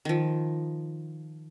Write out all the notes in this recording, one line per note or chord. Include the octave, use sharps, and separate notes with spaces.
D#3 F3